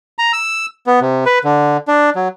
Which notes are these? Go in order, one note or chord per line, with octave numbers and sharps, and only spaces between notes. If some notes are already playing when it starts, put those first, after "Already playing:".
A#5
E6
B3
C3
B4
D3
D4
F#3